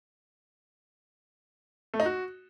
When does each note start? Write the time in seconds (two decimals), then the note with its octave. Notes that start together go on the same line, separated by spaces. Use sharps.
1.94 A3
2.00 D#4
2.06 F#4